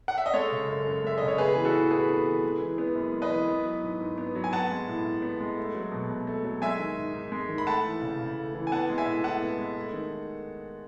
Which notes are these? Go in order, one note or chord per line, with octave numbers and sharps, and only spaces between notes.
F#5
E5
D#5
G#3 A4 C#5
C#3
F#2
F#2
G#3 E5
C#3 D#5
C#5
B3 G#4 B4
E3 G#4
F#4 A4
A2
A2 G#4 B4
B3
E3
G#3
E3
B3
F#2
G#3
B4 D#5
E3
B3
F#3
G#2
G#2
B3
F#3
G#5
B3 F#5 A5
G#3
A2
A2
B3
G#3
A3
F#3
B2
B2
A3
F#3
G#3 E5 G#5
D#3
G#2
G#2
G#3
D#3
B5
A3 F#5 A5
E3
C#3
C#3
A3
E3
G#5
B3 F#5 A5
G#3
E5 G#5
A2
A2 F#5 A5
B3
G#3
A3
D#3